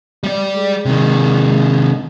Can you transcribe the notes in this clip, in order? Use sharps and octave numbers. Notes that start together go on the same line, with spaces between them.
G3 D5
G#3
C3 D#3